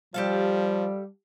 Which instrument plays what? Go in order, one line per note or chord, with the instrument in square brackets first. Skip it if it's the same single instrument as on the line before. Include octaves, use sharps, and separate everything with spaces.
[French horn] F3 [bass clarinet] G3 [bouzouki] G4 A4 F5